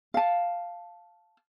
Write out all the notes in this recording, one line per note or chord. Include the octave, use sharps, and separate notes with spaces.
F5 A5